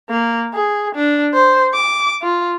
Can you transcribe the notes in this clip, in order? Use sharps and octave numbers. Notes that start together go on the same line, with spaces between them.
A#3
G#4
D4
C5
D6
F4